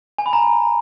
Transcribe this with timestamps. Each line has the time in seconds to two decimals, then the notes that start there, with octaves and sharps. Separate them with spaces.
0.18 G#5
0.26 B5
0.33 A#5